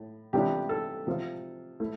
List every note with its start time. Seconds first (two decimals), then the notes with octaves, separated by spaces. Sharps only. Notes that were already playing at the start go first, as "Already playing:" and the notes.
Already playing: A2
0.33 C3 E3 B3 D4 F4 G4
0.69 A4
1.07 C3 F3 C4 F4
1.80 A3 E4